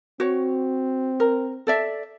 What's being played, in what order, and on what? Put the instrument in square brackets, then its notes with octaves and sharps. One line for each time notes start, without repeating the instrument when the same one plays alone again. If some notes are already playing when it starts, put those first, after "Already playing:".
[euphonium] C4 [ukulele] F#4 C#5
[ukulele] A#4
A4 D5 E5